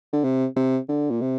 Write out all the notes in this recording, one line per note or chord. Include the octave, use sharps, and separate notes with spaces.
D3
C3
C3
D3
A#2
C3